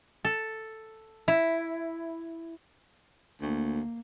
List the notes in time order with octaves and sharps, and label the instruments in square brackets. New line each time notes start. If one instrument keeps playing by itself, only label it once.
[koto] A4
E4
[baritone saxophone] D2 [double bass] A#3